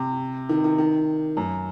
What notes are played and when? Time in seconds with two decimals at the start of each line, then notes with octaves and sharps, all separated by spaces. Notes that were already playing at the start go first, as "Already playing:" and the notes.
Already playing: C3
0.49 D#3
0.64 D#3
0.78 D#3
1.37 F#2